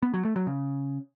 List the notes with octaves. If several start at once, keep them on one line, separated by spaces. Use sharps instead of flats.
B3
F#3
A3
F#3
C#3